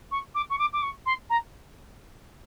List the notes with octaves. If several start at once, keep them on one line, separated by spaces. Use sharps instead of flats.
C#6
D6
C#6
D6
D6
C#6
C6
A#5